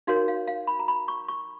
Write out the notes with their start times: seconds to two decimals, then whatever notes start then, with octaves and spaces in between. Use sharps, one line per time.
0.07 D#4 F#4 A#4 C#5 F5
0.28 F5
0.47 F5
0.67 B5
0.79 A#5
0.88 B5
1.08 C#6
1.28 C#6